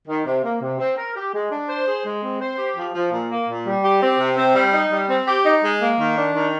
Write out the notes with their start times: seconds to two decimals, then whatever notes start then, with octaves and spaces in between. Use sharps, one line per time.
0.07 D#3
0.25 C3
0.43 A#3
0.60 C3
0.78 C4
0.96 A#4
1.14 G4
1.32 G#3
1.50 D4
1.68 C5
1.86 G#4
2.04 G#3
2.21 C4
2.39 C5
2.57 G4
2.75 F3
2.93 F3
3.11 A#2
3.29 A#3
3.47 A#2
3.65 G3
3.83 G4
4.01 C4
4.18 C3
4.37 C4
4.54 G3
4.72 D#4
4.90 G3
5.08 C4
5.26 G4
5.44 D#4
5.62 G#3
5.79 A#3
5.98 D#3
6.16 D4
6.33 D#3